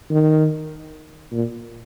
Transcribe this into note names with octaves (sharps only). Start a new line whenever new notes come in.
D#3
A#2